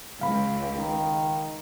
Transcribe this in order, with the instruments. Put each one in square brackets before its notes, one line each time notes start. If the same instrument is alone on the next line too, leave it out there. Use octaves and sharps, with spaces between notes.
[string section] C#2 [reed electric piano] F5 B5
[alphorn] D#3